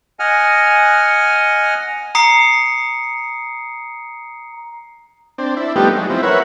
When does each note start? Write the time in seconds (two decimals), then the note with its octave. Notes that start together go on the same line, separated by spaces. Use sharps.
0.19 D#5 F#5 G#5 F6
2.15 A#5 D#6 C7 C#7
5.38 C4 D4
5.57 D4 E4
5.76 F3 G3 A3 B3 D#4 G4
5.97 F#3 G#3
6.10 F3 C4 E4
6.23 A#4 B4 C#5 E5 F#5